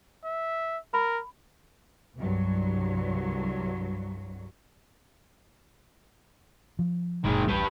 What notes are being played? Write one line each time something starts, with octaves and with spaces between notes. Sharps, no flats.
E5
A#4 B5
C2 G2 F#3
F3
F#1 A#2 D#3 G#3
D1 A1 G3 G4 B4